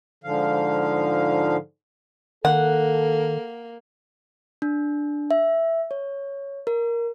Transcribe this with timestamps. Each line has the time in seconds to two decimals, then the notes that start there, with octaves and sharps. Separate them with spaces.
0.24 G#2 D3 F3 F5
2.45 D#3 A#3 A4 F#5
4.62 D4
5.31 E5
5.91 C#5
6.67 A#4